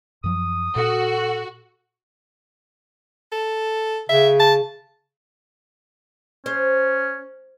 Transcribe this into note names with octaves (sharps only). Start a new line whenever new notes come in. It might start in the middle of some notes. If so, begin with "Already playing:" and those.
F#2 F3 F#3 D#6
A#2 F#4 A4
A4
C#3 E5
A5
C#4 C5